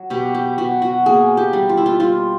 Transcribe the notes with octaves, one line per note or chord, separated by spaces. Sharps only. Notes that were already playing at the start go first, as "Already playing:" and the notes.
Already playing: F#3
B2 G4
G4
B2 F#4
F#4
A#3 G#4
G4
G3
F4
E4
F4
G3 F4